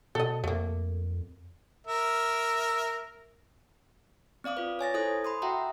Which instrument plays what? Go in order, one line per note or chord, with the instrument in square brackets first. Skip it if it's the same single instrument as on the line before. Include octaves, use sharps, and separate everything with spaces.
[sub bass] B2 [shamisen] A4 D#5
[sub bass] F2 [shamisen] A3 A#3
[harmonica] A#4 E5
[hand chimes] C4 D5 F5 D6 D#6
F4 B4
C#5 G#5 A6 A#6
E4 A4 C5 D#6 G#6
B5 C6 D#6
F#4 E5 F#5 G5 A#5